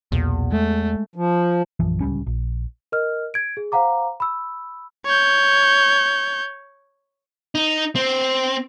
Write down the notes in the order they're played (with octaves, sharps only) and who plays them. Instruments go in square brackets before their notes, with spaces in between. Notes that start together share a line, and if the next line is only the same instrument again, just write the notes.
[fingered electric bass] B1 A#2 [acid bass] E2
[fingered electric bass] G#3 [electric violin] A3
[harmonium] F3
[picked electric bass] A#1 F#2 E3 F3
D1 C#2 G3 C#4
A#1
[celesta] A#4 D#5 F6
G#6 D7
G#4
C5 F5 F#5 A#5 D6
B5 E6
[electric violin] C#5 G6
[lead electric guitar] D#4
C4